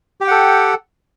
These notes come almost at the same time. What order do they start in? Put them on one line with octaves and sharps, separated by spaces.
G4 G5 F#5 A4